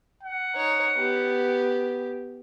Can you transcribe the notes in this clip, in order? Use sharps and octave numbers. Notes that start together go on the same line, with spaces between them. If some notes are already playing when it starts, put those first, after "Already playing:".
F#5
D#4 C#5
B3 G4